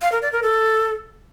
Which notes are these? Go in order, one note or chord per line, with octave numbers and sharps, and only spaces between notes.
F5
A#4
D5
A#4
A4